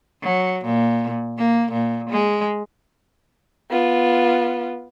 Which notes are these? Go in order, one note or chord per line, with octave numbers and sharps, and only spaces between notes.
F#3
A#2
A#3
A#2
G#3
B3 F4